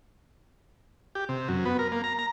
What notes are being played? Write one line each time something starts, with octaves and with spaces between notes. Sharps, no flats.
G4
C3
F#2
B3
A#4
A#3
A#5
A#5